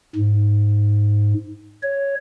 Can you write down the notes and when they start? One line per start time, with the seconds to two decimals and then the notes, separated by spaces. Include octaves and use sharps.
0.16 G#2
1.83 C#5